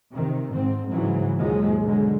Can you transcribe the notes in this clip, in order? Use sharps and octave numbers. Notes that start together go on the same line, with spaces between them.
C3 D#3
G#2 C4
G#2 C#3 E3 F#3
D#2 G#2 B2 F3 F#3 G#3
B2 D3 F#3 G#3